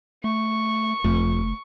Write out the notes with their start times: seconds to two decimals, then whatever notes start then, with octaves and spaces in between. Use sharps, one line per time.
0.24 A3 C#6
1.04 F#1 F2 A3